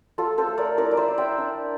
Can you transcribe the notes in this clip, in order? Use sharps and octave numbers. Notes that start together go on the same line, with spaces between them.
A3 F4 A4
A4 C5
A3
A#4 D5
E4 A#4 D5
D5
C5 E5
E4
E5 G5
D4